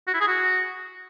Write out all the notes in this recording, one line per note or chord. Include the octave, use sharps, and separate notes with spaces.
F#4
E4
G#4
F#4